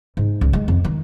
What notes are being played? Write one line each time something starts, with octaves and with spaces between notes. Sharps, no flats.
G#2
C#2
G#3
F2
D#3